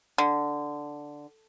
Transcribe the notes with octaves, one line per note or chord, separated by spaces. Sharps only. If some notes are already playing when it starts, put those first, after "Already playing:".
D3